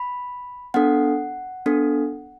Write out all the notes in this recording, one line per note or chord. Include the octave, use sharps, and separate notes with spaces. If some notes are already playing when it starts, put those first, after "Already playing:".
Already playing: B5
B3 D4 A4 F#5
B3 D4 A4